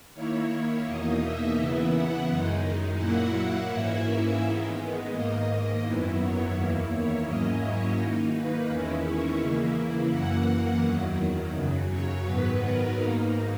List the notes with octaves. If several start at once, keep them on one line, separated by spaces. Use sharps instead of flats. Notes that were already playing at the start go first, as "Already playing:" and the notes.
D#3 A#3 E4 C#5
E2 B2 A#3 D#4 D#5
E5
C#3 E3 B3 E4
F#5
F#2 D#3 G#3 D#4
A#2 F#3 A#3 E4 F#5
G#2 E3 A#3 C#4 E4 E5
D#3 G#3 B3
G#2 D#3 A#3 D#5
F#2 D#3 F#3 B3 E4
C#5
E2 D#3 A#3 E4
C#5
G#2 F#3 A#3 C#4 E4 D#5
C#5
D#3 A#3 D#4
B4
E2 D#3 G#3 C#4 E4
C#5
C#3 E3 A#3 E4
F#2 E3 A#3 F#5
F#5
E2 D#3 F#3
F#2 C#3 F#3
C#5
G#2 D#3 F#3 B3 B4
A#4
G#2 D#3 A#3 D#4